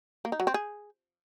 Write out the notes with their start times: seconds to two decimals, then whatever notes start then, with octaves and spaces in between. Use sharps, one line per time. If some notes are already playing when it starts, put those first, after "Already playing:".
0.25 A#3
0.32 D#4
0.40 F#3
0.47 C4
0.54 G#4